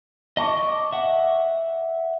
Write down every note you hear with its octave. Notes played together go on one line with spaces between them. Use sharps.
D#5 A5 C#6 D6
E5 F#5